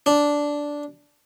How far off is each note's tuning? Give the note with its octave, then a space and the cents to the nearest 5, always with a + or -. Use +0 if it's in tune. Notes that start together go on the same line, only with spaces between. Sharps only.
D4 -5